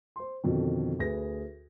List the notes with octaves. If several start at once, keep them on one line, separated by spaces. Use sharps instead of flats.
C5 C6
F2 B2 D3 D#3
D2 G#4 B4 A#6